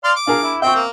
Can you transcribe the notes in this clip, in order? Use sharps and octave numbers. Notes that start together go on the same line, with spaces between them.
D5 F5 C6
D6
D4 G#4 A#4 F5
E4
C4 E5 G5 C#6
A#3